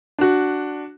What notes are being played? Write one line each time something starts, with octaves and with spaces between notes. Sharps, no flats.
D4 F#4